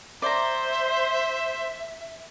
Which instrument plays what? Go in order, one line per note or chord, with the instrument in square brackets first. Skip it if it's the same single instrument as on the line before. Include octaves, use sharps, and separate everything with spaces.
[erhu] C5 [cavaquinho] D5 A#5 [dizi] E5